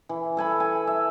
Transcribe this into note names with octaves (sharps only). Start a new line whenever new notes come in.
E3
A4 G#5 B5
G#5
E5